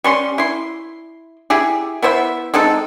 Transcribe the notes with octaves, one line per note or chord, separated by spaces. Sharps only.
G3 C#4 C6
E4 C6
E4 G4 G#4
B3 E4 C5 E5
G#3 C4 D#4 A4